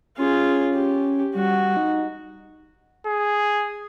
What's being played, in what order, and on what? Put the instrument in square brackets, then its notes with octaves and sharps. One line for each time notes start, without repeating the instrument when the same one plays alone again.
[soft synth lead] C#4 [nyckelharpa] F4 G#4
[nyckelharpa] G4
[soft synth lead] G3 [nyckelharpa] F#4
[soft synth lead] D#4
[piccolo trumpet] G#4